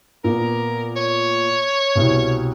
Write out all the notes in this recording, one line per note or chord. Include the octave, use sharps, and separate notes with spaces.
A#2 B3 A#4
C#5
C2 B2